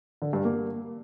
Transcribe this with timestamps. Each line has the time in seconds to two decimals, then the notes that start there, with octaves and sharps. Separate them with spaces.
0.22 D3
0.33 G2
0.45 A#3